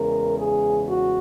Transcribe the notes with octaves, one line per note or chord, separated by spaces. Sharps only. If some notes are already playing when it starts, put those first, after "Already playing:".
Already playing: E2 C#3 G#3 A#4
G#4
F#4